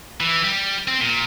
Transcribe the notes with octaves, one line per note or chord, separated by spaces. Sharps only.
E3
G3
C4
A#2